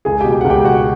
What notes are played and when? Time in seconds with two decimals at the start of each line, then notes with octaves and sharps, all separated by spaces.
0.05 C#2 G#4 G#5
0.21 B2 G4 G5
0.41 C#2 F#5
0.50 G4 G5
0.65 B2 F#4 F#5